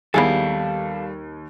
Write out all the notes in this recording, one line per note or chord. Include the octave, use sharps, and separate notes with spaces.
D#2 G3 B3 E4 G#4 A4 F5